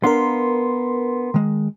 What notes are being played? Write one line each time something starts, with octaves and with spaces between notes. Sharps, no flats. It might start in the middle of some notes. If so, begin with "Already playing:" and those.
B3 D4 A#4 F5 C6
D#3 G#3